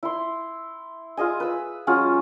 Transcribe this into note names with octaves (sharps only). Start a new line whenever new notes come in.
E4 C6
F4 G#4 D#5 G#5
B4 E6
F#3 G#3 C#4 F4